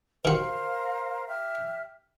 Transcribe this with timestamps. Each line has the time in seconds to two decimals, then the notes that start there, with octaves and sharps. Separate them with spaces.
0.25 D#3 F#4 A#4 C5 F5
1.27 G4 E5 F6